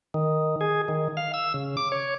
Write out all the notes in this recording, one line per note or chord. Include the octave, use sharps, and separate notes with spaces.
D#3
G#4
D#3
F5
E6
C#3
D6
C#5